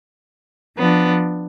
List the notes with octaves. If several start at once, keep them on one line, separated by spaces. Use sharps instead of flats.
F3 B3 D4